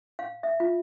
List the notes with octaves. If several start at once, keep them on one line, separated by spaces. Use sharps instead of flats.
F5
E5
F4